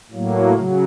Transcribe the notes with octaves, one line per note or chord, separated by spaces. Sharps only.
A2 F#3 A#3
C#3 F#3